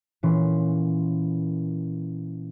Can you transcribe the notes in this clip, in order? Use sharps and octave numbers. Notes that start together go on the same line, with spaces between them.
A#2 E3 C#4 C6